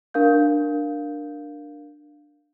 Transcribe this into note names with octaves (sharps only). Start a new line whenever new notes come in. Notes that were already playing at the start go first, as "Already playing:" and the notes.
D4 A#4 F5 G6